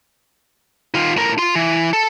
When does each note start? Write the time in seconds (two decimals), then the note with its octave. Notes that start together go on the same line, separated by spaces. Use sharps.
0.94 D#3 F4
1.17 A2 A#4
1.38 F4 C6
1.55 E3
1.93 A4